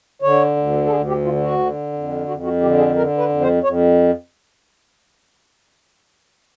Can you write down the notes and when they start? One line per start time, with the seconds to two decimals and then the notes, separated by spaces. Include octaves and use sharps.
0.22 D3 C#5
0.56 D2
0.86 A4
0.90 D2 G#4
1.08 G4
1.25 D3 F4
1.42 F#4
1.59 D3
1.93 F2
2.27 F2 F#4
2.44 F#4
2.61 D3 G4
2.78 G#4
2.96 D3 A#4
3.18 B4
3.29 F2
3.41 C5
3.63 F2 C#5